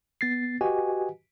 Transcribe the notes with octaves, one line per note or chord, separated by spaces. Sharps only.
B3 A6 C7
F#4 G4 B4 D#5 F#5 G#5